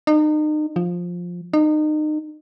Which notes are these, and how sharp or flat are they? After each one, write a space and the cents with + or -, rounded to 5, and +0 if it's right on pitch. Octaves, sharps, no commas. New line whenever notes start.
D#4 -35
F3 +10
D#4 -30